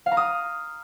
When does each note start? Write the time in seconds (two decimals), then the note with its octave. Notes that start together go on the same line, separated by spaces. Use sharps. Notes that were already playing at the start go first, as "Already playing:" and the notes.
0.06 F5
0.12 A#5
0.17 D#6